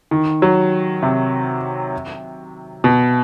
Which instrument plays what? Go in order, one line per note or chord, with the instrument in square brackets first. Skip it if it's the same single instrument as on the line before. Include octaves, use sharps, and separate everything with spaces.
[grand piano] D#3
F#3
C3
B2